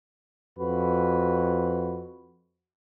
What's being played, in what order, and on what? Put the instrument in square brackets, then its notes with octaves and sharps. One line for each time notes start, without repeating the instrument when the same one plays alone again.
[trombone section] F2 F#4 B4